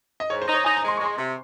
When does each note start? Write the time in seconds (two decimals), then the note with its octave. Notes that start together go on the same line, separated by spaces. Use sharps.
0.20 D#5
0.30 G#2 C#5
0.42 C5
0.47 D#4
0.54 C#5
0.64 D#4 G#5
0.77 A#5
0.83 G#3
0.88 C6
0.97 G#3 C#6
1.05 C6
1.18 C3